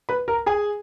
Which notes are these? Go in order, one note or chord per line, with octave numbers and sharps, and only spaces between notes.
B4 B5
A#4 A#5
G#4 G#5